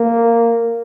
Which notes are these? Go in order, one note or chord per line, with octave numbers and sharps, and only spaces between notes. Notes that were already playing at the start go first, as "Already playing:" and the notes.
Already playing: A#3